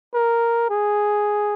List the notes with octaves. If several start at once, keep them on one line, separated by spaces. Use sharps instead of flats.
A#4
G#4